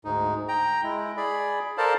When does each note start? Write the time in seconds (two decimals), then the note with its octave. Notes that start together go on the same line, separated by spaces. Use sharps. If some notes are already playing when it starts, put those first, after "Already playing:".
0.05 D2 G#2 D#4
0.48 G5 A#5
0.83 G#3 E4
1.17 G#4 D5 B5
1.78 A4 A#4 C5 D5 F5 A5